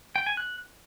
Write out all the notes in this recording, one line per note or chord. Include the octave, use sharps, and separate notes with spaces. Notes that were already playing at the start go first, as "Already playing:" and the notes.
G5
G#5
F#6